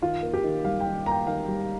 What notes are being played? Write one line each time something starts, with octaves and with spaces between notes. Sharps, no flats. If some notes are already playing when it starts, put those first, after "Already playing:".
D#3 F4
A#3
G4
D#3
G3 F5
G5
D#3
A#3 A#5
G5
D#3 F5
G3